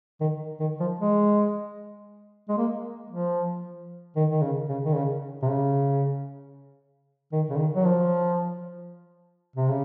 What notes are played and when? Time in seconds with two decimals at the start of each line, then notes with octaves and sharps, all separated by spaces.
0.21 D#3
0.60 D#3
0.80 F3
0.99 G#3
2.49 G#3
2.58 A#3
3.10 F3
4.16 D#3
4.31 D#3
4.42 C#3
4.69 C#3
4.85 D#3
4.95 C#3
5.43 C3
5.47 C#3
7.32 D#3
7.50 C#3
7.58 D#3
7.76 F#3
7.85 F3
9.56 C3
9.69 C#3